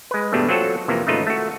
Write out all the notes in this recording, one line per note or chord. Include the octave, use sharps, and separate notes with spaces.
G#3 B4
E2 G2 B2 G3 A3 D4
F#3 C4 F4 F#4 A4
F2 C3 E3 A#3
G#1 C#3 A3 D#4 F4 B4
A3 F#4